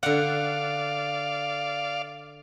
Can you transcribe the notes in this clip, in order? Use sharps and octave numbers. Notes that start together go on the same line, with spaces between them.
D3 D5 F5 F#5